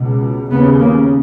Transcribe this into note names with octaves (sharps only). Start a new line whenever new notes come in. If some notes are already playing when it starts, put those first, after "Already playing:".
Already playing: C#2 B2
D#2 C#3 B3
A#3